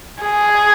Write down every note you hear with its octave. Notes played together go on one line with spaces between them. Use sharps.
G#4